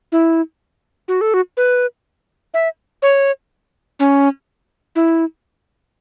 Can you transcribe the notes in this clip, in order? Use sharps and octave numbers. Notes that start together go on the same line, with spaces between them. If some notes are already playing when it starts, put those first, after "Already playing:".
E4
F#4
A4
F#4
B4
E5
C#5
C#4
E4